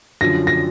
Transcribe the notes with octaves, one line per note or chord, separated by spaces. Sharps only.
F#2 D3 F3 A#6
A#6